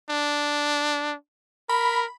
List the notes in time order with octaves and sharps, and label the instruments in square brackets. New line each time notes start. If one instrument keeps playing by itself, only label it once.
[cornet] D4
[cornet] A#4 [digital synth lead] B5